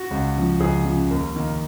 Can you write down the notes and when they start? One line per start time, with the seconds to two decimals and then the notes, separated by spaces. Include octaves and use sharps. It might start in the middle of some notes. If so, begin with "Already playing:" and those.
Already playing: F#4
0.11 C#2
0.36 C#3 F3
0.60 C#2 G#4
0.85 C#3 F3
1.11 D#2 A#4
1.36 D#3 A#3